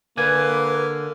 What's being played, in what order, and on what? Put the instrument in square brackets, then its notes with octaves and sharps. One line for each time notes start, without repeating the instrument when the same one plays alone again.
[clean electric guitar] D3 G#5 [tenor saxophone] A#3 [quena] B4